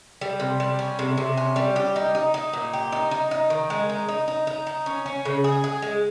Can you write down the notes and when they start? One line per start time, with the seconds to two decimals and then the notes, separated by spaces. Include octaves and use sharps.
0.21 G3
0.40 C3
0.60 G3
0.79 C#4
0.99 C3
1.18 C3
1.37 C#4
1.56 G3
1.76 G4
1.96 D#4
2.15 D#4
2.34 D#4
2.53 A#2
2.73 G4
2.92 D#4
3.11 D#4
3.31 D#4
3.50 D#3
3.70 G#3
3.89 D#4
4.09 D#4
4.28 D#4
4.47 D#4
4.67 D#4
4.86 C#4
5.06 C#4
5.25 C#3
5.44 G#4
5.64 G#4
5.82 G#3